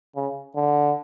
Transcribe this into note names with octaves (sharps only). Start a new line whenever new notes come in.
C#3
D3